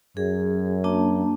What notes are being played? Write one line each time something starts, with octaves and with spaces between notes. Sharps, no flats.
F#2 G#4
A#3 D4 A5